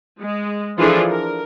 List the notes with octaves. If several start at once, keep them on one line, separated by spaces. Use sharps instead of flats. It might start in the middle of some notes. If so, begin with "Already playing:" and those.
G#3
E3 F3 D4 F4 G#4 A4
A#4